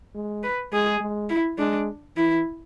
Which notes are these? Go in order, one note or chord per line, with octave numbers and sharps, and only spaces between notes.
G#3
B4
G#3 G#4
G#3
E4
G#3 D4
E3 E4